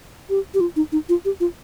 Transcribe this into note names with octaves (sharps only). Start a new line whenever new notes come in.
G4
G4
F4
D#4
D#4
F4
G4
F4